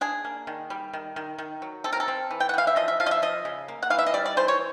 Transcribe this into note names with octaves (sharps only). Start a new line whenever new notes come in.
D4 G#4
A#3
D#3
G3
D#3
D#3
D#3
F#3
C4 A4
A#4
A4
C4
E3
G5
F#5
E3 F5
E5
F3 D#5
E5
F3 F5
D#5
E5
F3 D#5
C#3
A#3
F#5
E3 F5
E5
D#5
G3 D5
D5
E3 C5
C#5